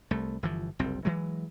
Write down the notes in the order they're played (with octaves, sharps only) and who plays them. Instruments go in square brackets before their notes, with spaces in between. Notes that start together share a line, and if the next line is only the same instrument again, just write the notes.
[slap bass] C2 A3
G1 E3 F3
F#1 C2 C4
E3 F#3 G#3